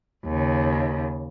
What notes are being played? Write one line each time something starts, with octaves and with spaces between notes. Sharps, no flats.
D#2 C#3